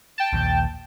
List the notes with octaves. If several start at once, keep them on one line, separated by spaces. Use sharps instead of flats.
G5 A5
A#1 D#2